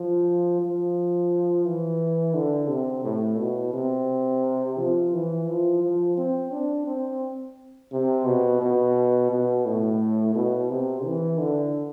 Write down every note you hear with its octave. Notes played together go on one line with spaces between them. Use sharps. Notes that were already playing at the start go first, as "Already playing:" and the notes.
Already playing: F3
F3
E3
D3
C3
A2
B2
C3
F3
E3
F3
F3
C4
D4
C4
C3
B2
B2
B2
A2
B2
C3
E3
D3